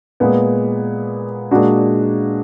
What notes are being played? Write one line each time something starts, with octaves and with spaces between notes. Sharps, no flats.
A#2 G#3 B3
A#2 G#3 D4 F#4